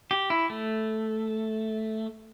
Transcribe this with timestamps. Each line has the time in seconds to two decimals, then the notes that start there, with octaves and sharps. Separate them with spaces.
0.11 G4
0.30 E4
0.50 A3